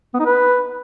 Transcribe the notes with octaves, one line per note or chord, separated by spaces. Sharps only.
B3
D#4
B4